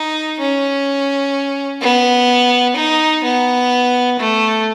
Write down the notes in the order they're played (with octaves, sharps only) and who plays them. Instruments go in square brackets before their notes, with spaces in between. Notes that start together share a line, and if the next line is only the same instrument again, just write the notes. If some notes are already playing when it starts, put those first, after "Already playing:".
Already playing: [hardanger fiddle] D#4
C#4
B3
D#4
B3
A3